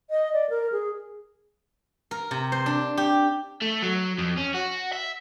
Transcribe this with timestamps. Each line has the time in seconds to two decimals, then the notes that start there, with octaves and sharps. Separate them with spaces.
0.10 D#5
0.33 D5
0.50 A#4
0.72 G#4
2.11 A#4
2.31 C3
2.52 C5
2.66 D4
2.97 G4
3.61 A3
3.82 F#3
4.18 F2
4.38 C#4
4.55 F#4
4.93 E5